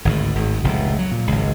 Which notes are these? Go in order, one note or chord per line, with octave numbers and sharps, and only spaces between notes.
G#1 D2 A2
G#1 A2
F1 C#2 A#2
F#3
A#2
G#1 C#2